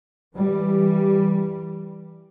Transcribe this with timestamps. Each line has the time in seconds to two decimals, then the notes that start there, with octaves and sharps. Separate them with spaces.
0.36 E3 G3